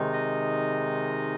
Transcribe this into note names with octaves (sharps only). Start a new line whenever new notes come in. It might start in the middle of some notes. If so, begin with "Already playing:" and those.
Already playing: C3 D#3 G#3 D#4
D#5